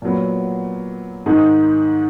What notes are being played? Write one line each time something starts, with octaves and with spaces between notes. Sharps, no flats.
A#2 F#3 B3
G#2 D#3 G#3 D#4